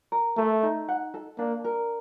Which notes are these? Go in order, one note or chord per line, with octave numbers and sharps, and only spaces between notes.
A#4
A3 A4
D#4
F#5
A4
A#3 D4
A#4